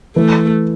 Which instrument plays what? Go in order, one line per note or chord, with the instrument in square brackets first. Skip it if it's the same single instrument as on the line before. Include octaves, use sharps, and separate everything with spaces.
[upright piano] E3 [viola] A3